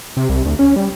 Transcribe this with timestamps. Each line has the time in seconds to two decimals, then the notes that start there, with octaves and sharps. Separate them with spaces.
0.17 C3
0.29 C2
0.45 D2
0.59 C#4
0.76 G3